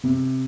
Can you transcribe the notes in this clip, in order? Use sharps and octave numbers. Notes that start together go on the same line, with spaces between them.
C3